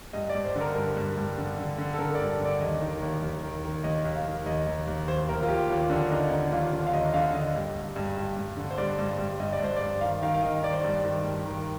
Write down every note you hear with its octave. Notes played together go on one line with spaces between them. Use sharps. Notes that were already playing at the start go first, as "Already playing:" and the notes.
G2 D#5
D5
G2
C5
D3 A#4
G2
G2
G2
D3
D3
D3
A4
D3 A#4
D5
G2
D3
D5
D#2 D#5
D#3
D#2
D#2
D#3
D#3
D#2 D#5
D#2
F5
D#3
D#2 D#5
D#2
D#2
D#2 C5
D#2 A#4
F4
D#2 G4
D#2 F4
D3 D4
D3 D#4
D3 D#4
D#2 F4
D3
F5
D#2 D#5
D3 F5
D3 D#5
G2
G2
G2
G2
G2
D3
C5
G2 D5
G2
G2
G2 D#5
D5
G2 C5
D5
G2
D#3 F5
D#3 F5
F5
D#3 D#5
D#3 D5
C5
G2 D5
D#3
G2
D#3